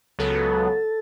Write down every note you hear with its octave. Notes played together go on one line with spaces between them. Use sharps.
C#2 C#3 F#3 B3 A4